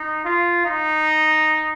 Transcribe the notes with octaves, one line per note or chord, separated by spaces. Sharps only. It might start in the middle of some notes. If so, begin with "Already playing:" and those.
Already playing: D#4
F4
D#4